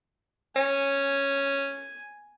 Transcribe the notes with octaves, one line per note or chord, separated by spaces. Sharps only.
C#4 G#5